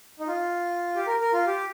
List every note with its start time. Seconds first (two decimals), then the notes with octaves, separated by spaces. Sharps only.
0.19 D#4
0.27 F4
0.95 G4
1.07 A#4
1.20 A#4
1.33 F4
1.47 G4